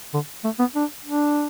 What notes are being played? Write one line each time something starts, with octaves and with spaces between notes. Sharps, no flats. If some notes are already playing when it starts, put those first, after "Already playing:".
D3
A3
B3
D4
D4